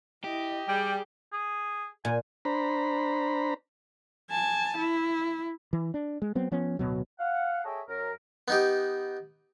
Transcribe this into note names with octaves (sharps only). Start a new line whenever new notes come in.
E4 G4 D#5
G3 G#4 G5
G#4
A#2 G#5
D4 C5 A#5 B5
G#5 A5
E4
E3
D4
G#3
F#3 B3 C4
F3 B3 C#4
D1 B2 F#3
F5 F#5
G#4 A4 C#5 D#5 E5 G5
F#2 A#4
B3 D#4 G4